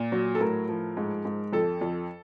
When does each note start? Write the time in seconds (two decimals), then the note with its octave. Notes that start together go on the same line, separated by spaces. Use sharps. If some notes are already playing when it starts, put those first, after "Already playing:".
Already playing: A#2
0.12 F#3
0.35 A4
0.40 A2 A#4
0.69 F3
0.97 G#2
1.25 G#2
1.53 F2 A4
1.81 F2